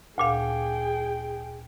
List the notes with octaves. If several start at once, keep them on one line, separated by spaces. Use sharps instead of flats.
D2 A#2 G#4 F5 G5